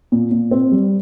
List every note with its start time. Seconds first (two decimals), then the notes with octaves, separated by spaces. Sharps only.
0.12 A#2
0.31 A#2
0.51 C4
0.72 G3